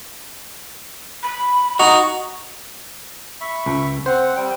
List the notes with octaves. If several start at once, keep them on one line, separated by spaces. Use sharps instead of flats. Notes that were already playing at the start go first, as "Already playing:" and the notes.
B5
D#4 F#4 C#6
E5 B5 C#6
C#2
C4 C5 F#5
G3 C4 G5